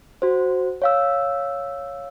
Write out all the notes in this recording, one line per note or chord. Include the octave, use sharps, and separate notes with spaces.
F#4 C5
C#5 F5 E6